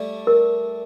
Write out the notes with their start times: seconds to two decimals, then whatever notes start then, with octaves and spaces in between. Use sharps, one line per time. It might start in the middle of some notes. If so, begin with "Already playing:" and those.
Already playing: G3 A3 D5
0.27 A#4